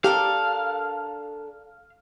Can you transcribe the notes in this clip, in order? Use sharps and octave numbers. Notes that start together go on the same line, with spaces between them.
D4 G4 A4 A#4 F5